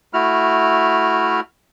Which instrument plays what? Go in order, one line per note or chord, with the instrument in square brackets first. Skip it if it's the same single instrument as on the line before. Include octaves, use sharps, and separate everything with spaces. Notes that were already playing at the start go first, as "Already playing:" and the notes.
[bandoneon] A3 E4 F#4 F6